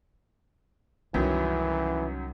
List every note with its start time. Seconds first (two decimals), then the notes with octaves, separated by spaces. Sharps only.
1.14 C2 F#2 D#3 E3 F#3